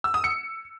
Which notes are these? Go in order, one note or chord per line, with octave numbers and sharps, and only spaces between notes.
E6
D#6
C#7